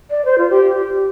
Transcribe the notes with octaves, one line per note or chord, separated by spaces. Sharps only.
D5
C5
F4
G4